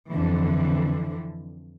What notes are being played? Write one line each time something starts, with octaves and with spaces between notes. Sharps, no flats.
F2 D3 E3